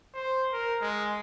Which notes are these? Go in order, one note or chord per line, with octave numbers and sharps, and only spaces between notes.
C5
A#4
G#3